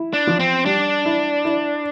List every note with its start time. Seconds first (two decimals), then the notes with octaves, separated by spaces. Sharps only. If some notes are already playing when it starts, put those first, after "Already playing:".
Already playing: E4
0.13 D4
0.27 F3
0.40 C4
0.65 G3 D4
1.06 E4
1.45 E4